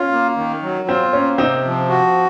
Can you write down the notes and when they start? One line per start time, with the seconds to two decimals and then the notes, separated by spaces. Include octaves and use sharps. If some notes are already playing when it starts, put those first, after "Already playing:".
Already playing: C#4 F4
0.11 A#3
0.37 D#3
0.63 F#3
0.88 C4 F4
1.13 A#3 C#4
1.38 C3 C4 D#4
1.65 F3
1.89 F#4